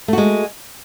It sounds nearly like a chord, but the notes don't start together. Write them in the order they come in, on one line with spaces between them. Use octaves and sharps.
A3 F#4 G#3